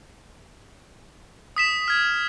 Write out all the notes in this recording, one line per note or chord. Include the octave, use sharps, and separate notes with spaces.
D#6 B6 E7
F6 G#6